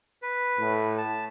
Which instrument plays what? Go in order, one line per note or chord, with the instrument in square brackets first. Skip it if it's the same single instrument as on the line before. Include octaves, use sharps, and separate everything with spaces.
[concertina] B4
[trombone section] A2
[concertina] A5